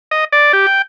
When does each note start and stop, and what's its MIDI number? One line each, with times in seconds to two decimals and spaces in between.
0.11 0.25 75
0.32 0.52 74
0.53 0.66 67
0.67 0.82 79